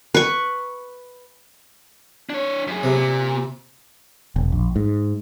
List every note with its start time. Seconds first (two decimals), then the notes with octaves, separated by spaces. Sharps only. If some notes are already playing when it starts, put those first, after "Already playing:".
0.14 B4 C#6
2.30 D4 C#5
2.67 F#2 G#4
2.83 C3
2.96 A#2
4.36 E1
4.52 A#1
4.76 G#2